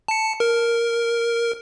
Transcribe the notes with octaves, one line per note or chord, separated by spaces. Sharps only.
A5 C#7
A#4